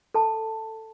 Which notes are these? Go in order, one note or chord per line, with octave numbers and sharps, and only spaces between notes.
A4 A5